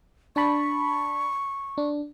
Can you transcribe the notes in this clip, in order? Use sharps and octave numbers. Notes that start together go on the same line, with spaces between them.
D4 A5 B5 C#6
D4